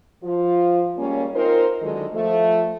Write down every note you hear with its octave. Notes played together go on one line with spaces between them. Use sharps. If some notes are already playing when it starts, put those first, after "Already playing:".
F3 F4
G3 G#3 A#3 C#4
C4 D#4 F4 A#4 C5
E2 D3 D#3 F#3 G#3 A4
F3 A3